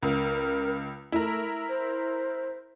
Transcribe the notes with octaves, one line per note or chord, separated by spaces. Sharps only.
C#2 A#4
A3 E4 A#4
C5